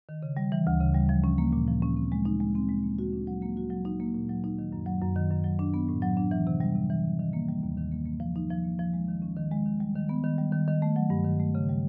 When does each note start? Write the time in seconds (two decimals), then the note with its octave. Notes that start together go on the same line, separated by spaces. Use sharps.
0.09 D#3
0.23 C#3
0.37 G3
0.52 E3
0.67 D2
0.81 C#3
0.95 G3
1.09 F3
1.24 C#4
1.38 A#3
1.53 A#2
1.68 F3
1.82 C#4
1.96 C4
2.12 G#3
2.25 D#4
2.40 G#3
2.55 C4
2.69 G#3
2.83 A#3
2.99 F#4
3.13 D4
3.27 F#3
3.42 A#3
3.57 F#4
3.70 F#3
3.85 D#4
4.00 A#3
4.14 A#2
4.29 F#3
4.44 D#4
4.59 D#3
4.73 F#2
4.86 F#3
5.02 F#2
5.16 D#3
5.31 F#2
5.44 F#3
5.59 D4
5.74 B3
5.89 A2
6.02 F#3
6.17 D4
6.31 E3
6.47 C3
6.60 G3
6.75 C3
6.90 E3
7.05 C3
7.19 D#3
7.33 A#3
7.48 G3
7.63 D#2
7.77 D#3
7.92 A#3
8.05 A#3
8.20 F3
8.36 D#4
8.50 F3
8.64 A#3
8.79 F3
8.93 G#3
9.08 D#3
9.22 C#4
9.36 D#3
9.51 G#3
9.66 D#3
9.80 G3
9.95 D#3
10.09 B3
10.24 D#3
10.38 G3
10.52 D#3
10.68 D#3
10.82 A3
10.96 F#3
11.10 G2
11.25 D#3
11.39 A3
11.55 C#3
11.69 G3